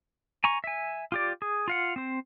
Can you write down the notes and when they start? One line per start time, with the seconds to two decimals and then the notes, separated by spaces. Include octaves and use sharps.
0.44 G#5 A#5 C#6
0.64 E5 G#5
1.12 F4 G4 D5
1.42 G#4
1.68 F4 F5 F#5
1.96 C4 C5